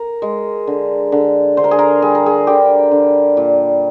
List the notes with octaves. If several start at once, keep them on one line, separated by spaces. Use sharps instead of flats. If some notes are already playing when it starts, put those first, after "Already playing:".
Already playing: A#4
G#3
D3
D3
D3 C5
A#4
G#4
A#4
G3 G#4
A#4
G#4
D3 G4
D3
A#2